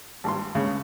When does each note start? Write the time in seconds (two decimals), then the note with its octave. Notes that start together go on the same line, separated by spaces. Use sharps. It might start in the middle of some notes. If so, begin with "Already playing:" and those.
0.24 G#1 G2 C6
0.55 C#2 C#3